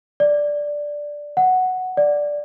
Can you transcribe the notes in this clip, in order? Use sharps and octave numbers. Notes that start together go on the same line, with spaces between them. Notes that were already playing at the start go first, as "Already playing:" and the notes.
D5
F#5
D5